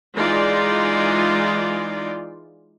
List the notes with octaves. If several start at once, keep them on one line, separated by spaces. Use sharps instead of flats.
E3 G#3 D#4 F4 D5